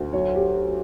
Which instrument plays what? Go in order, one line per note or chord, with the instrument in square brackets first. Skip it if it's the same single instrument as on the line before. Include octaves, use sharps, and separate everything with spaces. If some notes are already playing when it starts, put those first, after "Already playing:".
Already playing: [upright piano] D2
F#3 C#5
G4